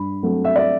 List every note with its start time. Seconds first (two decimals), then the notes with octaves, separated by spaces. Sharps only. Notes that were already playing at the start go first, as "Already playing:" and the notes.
Already playing: G2 B5
0.23 F#3 A3 C4
0.45 E5
0.56 D5